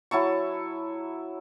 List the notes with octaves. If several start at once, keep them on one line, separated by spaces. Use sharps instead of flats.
F#3 E4 A5 C#6